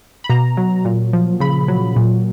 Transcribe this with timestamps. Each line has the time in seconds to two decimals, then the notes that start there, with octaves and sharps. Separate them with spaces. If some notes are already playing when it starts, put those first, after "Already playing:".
0.24 B5
0.29 B2 A#5
0.57 F#3
0.85 A#2
1.13 F3
1.40 C#3 B5
1.68 F#3
1.96 A#2